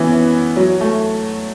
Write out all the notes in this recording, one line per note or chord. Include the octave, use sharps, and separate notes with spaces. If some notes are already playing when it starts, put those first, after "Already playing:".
Already playing: E3 B3 C#4
F#3
A3